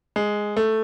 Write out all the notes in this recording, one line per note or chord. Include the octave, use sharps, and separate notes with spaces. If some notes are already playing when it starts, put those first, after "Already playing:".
G#3
A3